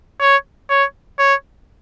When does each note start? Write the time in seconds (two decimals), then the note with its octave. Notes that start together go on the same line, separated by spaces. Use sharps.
0.21 C#5
0.70 C#5
1.19 C#5